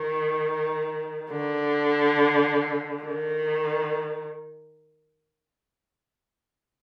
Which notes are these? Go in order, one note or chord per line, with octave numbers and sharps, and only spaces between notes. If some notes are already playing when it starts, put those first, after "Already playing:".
Already playing: D#3
D3
D#3